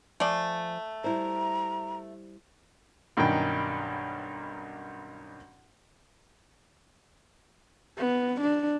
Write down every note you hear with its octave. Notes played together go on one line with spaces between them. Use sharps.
F3 A3 D5 F5 G#5
G3 E4 C5 A#5
B1 G2 D#3 C#4 D#4 G5
B3
D4